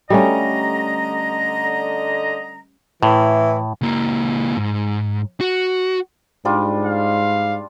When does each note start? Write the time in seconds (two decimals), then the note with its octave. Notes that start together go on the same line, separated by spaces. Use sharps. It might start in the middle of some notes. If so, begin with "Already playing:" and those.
0.10 D3 G3 A3 C#4 D#5 A#5
3.03 A2 E3
3.82 C#2 A#3
4.56 G#2
5.41 F#4
6.45 G#2 G3 D4 F4
6.85 F5